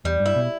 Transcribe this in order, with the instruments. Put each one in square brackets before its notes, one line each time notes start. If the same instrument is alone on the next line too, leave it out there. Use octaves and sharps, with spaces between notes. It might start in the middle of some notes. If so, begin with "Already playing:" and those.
[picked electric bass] E2 [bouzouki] G3
[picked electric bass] G2
[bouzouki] E4
[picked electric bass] B2